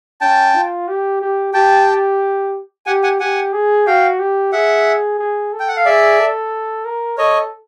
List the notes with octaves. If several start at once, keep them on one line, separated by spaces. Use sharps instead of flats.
C#4 G5 A5
F4
G4
G4
G4 G5 A5
G4 F#5 G#5
F#5 G#5
G4 F#5 G#5
G#4
F#4 F5 G5
G4
G#4 E5 F#5
G#4
A4
G5
F#5
F5
G#4 D5 E5
A4
A#4
A4 C#5 D#5